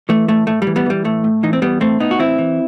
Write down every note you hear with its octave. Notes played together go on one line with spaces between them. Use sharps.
E3 A3
A2 A3
A2 A3
G3
E3
G3 B3
E3 G3
A2 A3
A2
E3 D#4
C4
E3 G3 B3
A2 A3 C4
A2 B3 D#4
F#4
E3 C4 E4
E3